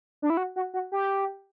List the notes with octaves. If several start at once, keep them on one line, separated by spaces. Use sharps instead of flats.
D4
E4
F#4
F#4
F#4
G4